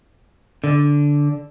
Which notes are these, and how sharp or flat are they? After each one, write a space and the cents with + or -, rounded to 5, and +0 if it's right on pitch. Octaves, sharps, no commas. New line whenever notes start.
D3 -10